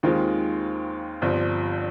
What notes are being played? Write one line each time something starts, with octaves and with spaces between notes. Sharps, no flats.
D#2 D#3 G#3 C4 F4
G1 G2 F3 C4